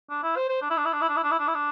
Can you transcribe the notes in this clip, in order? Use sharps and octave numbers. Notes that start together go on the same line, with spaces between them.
D4
E4
C5
C5
D4
E4
D4
E4
D4
E4
D4
E4
D4
E4
D4
E4
D4